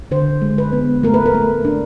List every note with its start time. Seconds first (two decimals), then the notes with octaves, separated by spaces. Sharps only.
0.11 D3 C5
0.42 G#3
0.58 B4
0.72 B3
1.03 A3 A#4
1.14 B4
1.26 A#4
1.34 A3
1.65 D4